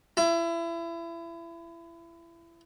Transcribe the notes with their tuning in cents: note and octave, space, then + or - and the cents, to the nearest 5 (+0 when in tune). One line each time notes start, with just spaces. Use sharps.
E4 +30